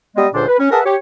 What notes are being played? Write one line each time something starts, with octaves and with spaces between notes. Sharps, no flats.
G3 G#3 B3 D#5
C#2 A#2 D3 D4 C5 D6
B4
C#4
G#4 A#4 B4 E5 F#5 A5
G4 C#5